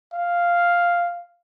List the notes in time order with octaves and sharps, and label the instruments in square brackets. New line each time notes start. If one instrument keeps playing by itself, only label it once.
[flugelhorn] F5